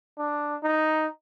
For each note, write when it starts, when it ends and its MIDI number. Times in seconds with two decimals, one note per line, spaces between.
0.18 0.56 62
0.63 1.07 63